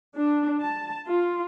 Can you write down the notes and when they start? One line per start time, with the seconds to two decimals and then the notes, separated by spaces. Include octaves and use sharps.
0.17 D4
0.61 A5
1.07 F4